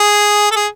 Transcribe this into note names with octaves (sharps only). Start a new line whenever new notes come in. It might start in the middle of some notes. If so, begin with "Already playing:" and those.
Already playing: G#4
A4
G#4